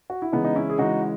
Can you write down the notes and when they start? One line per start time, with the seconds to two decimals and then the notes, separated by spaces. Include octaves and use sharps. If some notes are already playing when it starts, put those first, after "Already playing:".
0.10 F#4
0.22 E4
0.32 C#3 E3 G#3 B3 D#4
0.44 D#4
0.56 C#4 E4
0.70 G#4
0.78 C#3 E3 G#3 D#4 F#4